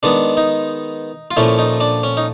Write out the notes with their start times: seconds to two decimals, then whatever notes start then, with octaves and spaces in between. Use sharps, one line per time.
0.03 D#3 G#3 B3 D4
0.37 D#4
1.31 F4
1.37 A#2 F3 A3 C#4 E4
1.59 D#4
1.81 D4
2.03 C#4
2.17 D#4